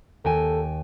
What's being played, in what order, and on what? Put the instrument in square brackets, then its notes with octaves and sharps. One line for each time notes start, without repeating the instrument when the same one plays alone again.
[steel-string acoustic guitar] D#2 G5 G#5 [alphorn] A4